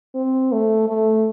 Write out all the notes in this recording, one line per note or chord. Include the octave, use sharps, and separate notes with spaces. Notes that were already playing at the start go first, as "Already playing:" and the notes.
C4
A3
A3